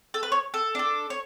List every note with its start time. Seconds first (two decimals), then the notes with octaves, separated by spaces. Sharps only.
0.14 A4
0.23 B4
0.32 C#5
0.54 A4
0.75 D4 A4
1.10 C#5